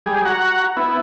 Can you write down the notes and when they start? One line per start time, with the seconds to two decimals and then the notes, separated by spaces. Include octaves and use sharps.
0.06 G3 G#4
0.25 F#4 F#5 A#5
0.77 B3 E4